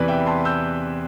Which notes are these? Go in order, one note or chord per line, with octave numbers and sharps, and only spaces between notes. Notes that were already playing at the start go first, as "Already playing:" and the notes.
Already playing: E2 C3 E3 B4 D5
E5 G5
B5
A5 C6
E6 G6